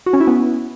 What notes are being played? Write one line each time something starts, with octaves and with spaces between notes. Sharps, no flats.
F#4
C#4
E4
B3